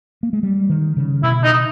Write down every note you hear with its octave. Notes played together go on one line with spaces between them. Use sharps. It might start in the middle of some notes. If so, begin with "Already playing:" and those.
A#3
G#3
G3
D#3
C#3
B2 E4
D#4